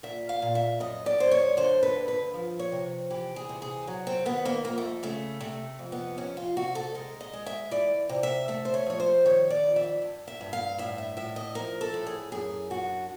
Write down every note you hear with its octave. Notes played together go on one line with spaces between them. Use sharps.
A#2 E5
F5
A#2
E5
F#2 D#5
D5
F#2 C5
C#5
D3 C5
B4
G2
B4
F3
C#5
C3
E3 G4
G#4
C3
G#4
F#3
C4
D#3 B3
A#3
F2 A#3
A3
C#3 A3
C3 A3
F2
B3
C3 C#4
F4
C3 F#4
A4
G#3 A#4
D#5
G#3
E5
E3 D5
C3
E5
A3 E5
C5
C#5
F3 C#5
C5
D#3 C#5
D5
F2
E5
G2
E5
G2
F5
A2 E5
E5
A2 E5
D#5
F3 A#4
A4
A2
G#4
F#2 G#4
D3 F#4